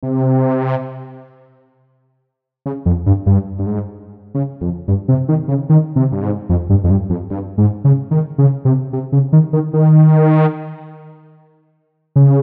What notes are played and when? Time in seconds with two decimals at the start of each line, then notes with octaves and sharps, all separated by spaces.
0.03 C3
2.66 C#3
2.86 F2
3.06 G2
3.26 G2
3.59 G2
3.66 G#2
4.35 C#3
4.61 F2
4.88 G2
5.08 C3
5.28 D#3
5.48 C#3
5.69 D#3
5.96 C3
6.12 G2
6.23 G#2
6.49 F2
6.70 G2
6.84 F2
6.90 G2
7.10 F2
7.30 G2
7.58 G#2
7.84 C#3
8.11 D#3
8.38 C#3
8.65 C3
8.93 C3
9.12 C#3
9.33 D#3
9.53 D#3
9.73 D#3
12.16 C#3